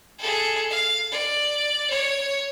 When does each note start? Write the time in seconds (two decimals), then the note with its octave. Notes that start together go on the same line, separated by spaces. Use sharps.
0.18 G#4 A4
0.70 F5
1.11 D5
1.90 C#5